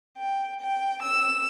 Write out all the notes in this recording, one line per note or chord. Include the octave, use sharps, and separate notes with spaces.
G5
G5
E6